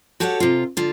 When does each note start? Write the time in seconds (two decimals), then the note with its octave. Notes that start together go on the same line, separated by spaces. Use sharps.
0.20 F#4 G4 A4 C#5 E5 F#5
0.40 C3 F4
0.77 D3 F4